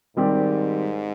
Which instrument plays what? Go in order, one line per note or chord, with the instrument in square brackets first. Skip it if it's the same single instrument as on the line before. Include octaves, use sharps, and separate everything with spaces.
[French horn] G#2 [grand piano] D#3 G3 C4 G4 D5